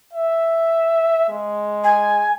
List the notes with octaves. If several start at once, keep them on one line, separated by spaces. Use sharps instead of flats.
E5
G#3
G#5